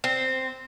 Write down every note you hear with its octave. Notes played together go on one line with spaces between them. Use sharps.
C4